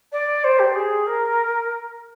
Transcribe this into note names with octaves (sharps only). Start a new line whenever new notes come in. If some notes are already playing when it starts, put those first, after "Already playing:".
D5
C5
G4
G#4
A#4